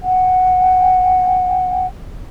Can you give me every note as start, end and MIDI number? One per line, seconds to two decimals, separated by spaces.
0.01 1.86 78
0.01 1.86 79